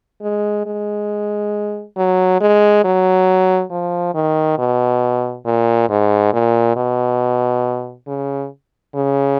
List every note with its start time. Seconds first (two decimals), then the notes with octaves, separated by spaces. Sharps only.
0.22 G#3
0.66 G#3
1.97 F#3
2.40 G#3
2.84 F#3
3.71 F3
4.14 D#3
4.59 B2
5.46 A#2
5.89 G#2
6.33 A#2
6.77 B2
8.08 C#3
8.95 C#3